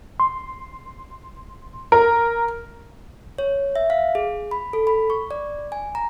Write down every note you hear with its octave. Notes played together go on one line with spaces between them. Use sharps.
C6
A#4
C#5
E5
F5
G#4
B5
A4
B5
C#6
D5
G#5
A#5